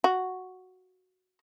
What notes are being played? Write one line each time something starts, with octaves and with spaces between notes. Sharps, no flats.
F#4